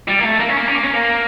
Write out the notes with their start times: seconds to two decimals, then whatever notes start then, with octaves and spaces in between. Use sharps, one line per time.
0.08 G3
0.19 A#3
0.24 A3
0.40 A#3
0.49 C#4
0.58 A#3
0.68 C#4
0.75 A#3
0.84 C#4
0.94 A#3